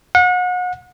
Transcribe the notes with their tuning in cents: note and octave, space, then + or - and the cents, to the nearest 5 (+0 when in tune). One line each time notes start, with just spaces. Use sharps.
F#5 -35